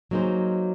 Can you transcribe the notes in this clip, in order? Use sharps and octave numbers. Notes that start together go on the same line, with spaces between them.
F#3 A#3 D#4 G#4 C5